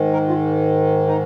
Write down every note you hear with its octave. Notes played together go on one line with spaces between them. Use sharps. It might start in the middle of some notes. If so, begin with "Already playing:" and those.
Already playing: G#2 D#3
A#4
F4
D#4